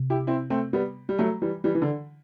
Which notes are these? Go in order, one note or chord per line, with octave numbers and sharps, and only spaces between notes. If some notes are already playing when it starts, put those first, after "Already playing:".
Already playing: C3
E4 G4
C4 E4
A3 C4
G3 B3
G3
F#3 A3
E3 G3
E3 G3
E3
D3